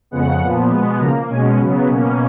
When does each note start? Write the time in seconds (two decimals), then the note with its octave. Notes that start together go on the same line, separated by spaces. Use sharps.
0.11 F2 C#3 G#3 B3 F#5
0.42 A#2 F3 B3
0.70 B2 G#3 B3
0.99 C#3 F3 A#3 A#5
1.29 B2 G#3 C#4 G#5
1.59 C#3 F#3 B3
1.88 B2 A#3 C#4